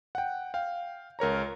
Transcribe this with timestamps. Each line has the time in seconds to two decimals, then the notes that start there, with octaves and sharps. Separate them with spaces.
0.15 F#5 G5
0.54 F5 G5
1.19 C#2 A#4 C#5 A#5